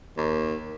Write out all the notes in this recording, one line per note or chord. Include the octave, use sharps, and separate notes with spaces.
D#2